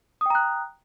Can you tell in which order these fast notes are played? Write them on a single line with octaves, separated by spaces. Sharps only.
D#6 G5 A#5 F#6